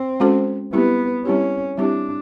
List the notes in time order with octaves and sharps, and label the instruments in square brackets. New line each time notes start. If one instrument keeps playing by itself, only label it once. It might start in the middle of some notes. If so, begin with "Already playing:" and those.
Already playing: [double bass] C4
[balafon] G#3 C#4 F#4 A4 C5
[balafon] G3 C4 E4 G4 [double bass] B3
[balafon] G3 C4 E4 G4 [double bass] C#4
[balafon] G3 C4 E4 G4 [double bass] D4